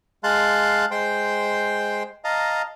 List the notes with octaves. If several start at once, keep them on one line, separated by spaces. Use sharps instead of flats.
G#3 F5 A5 C6 F#6
G#3 C5 G5 C6
D#5 F5 A5 A#5